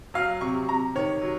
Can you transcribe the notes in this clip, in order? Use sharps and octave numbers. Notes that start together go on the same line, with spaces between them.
F#3 F5
C3 C#6
C3 A#5
D#3 C#5
F#3